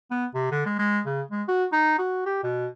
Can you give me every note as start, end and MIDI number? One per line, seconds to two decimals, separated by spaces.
0.10 0.26 59
0.34 0.51 48
0.52 0.61 50
0.66 0.79 56
0.79 1.00 56
1.06 1.22 49
1.31 1.43 56
1.48 1.65 66
1.72 1.97 63
1.99 2.23 66
2.26 2.42 67
2.43 2.67 47